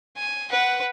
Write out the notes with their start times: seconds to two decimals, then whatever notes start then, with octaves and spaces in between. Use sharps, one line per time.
0.17 G#5
0.51 B4 F#5